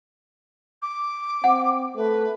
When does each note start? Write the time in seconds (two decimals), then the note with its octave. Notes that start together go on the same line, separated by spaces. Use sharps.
0.82 D6
1.44 C4 F#5
1.97 A3 B4